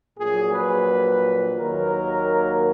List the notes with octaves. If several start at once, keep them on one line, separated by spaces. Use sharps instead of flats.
A#1 A#2 F#3 G#4
B4
D#2 D#3 F#3 A#3 A#4